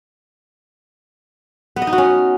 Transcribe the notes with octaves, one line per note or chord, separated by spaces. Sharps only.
B3
D#5
D#4
F#4
C#4